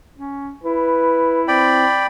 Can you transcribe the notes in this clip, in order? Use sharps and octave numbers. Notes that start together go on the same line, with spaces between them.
C#4
E4 B4
C4 D5 G5 B5